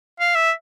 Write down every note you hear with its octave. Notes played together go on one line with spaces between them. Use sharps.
F5
E5